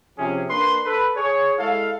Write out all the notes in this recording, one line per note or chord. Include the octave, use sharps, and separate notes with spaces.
C3 F3 C#4 G#4
A#3 D4 B4 C6
A4 B4
G#4 C#5
G#3 E4 A4 F5